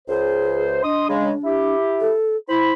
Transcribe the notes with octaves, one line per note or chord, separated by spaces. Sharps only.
C#2 G#4 C5
D4 D#5 C6 D#6
C#3 G#3
E4 G4
A4
E4 C5 B5